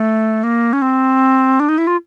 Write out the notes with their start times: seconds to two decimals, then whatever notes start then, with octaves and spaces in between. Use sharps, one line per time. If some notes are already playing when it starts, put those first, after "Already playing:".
Already playing: A3
0.43 A#3
0.73 C#4
0.82 C4
1.60 D4
1.69 D#4
1.78 E4
1.87 F4